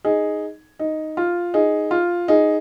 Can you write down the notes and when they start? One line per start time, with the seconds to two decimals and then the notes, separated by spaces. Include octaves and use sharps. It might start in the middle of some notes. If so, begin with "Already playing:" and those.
0.05 D#4 G#4
0.79 D#4
1.17 F4
1.54 D#4 G#4
1.91 F4
2.28 D#4 G#4